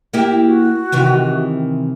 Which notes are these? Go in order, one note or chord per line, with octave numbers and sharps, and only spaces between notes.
A#3 E4 G4
F#4
C3 D#3 E3